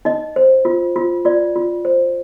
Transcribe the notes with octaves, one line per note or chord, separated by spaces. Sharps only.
D#4 D#5
C5
F4
F4
F4 D5
F4
C5